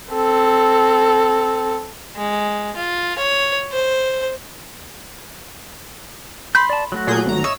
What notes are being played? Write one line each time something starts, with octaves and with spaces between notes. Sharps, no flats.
C4 A4
G#3
F4
C#5
C5
B5 C6 G6
D5 A5
F#3 A3 F#4
A#2 G#4 G6
G#1 A#5
C#5 D#5 E5 E6